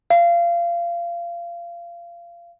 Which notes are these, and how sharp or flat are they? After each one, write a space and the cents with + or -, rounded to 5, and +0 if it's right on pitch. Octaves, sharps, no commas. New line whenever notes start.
F5 -25